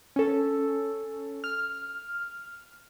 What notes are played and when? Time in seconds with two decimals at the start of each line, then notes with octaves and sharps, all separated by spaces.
0.16 C#4 A4
1.44 F6